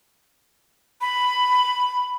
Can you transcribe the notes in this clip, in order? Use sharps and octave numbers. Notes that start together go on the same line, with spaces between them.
B5